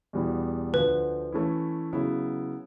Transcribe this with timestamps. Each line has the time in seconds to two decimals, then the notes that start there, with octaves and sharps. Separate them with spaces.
0.13 E2 B2 G3 B3 E4
0.73 D2 D3 F3 B4
1.32 E3 A3 C#4 E4
1.93 C#3 F#3 B3 E4